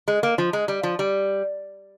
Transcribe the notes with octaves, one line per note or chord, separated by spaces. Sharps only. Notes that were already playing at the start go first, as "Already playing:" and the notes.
G#3
A#3
F3
G#3
G3
F3
G3